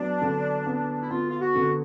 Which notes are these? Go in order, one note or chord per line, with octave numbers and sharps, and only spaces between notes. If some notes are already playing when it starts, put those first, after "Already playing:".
Already playing: F#3 B3 D4
D3
B3
E4
B3 F4
F4
F#4
D3